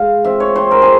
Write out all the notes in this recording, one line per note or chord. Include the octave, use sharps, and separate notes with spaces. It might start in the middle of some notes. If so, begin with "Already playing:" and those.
Already playing: G#3 F5
C4 E5
C#5
C4 C5
A#4
G#4